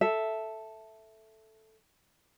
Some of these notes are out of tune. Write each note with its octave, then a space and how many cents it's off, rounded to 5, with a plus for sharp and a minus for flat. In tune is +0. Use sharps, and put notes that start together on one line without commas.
A4 +0 E5 +0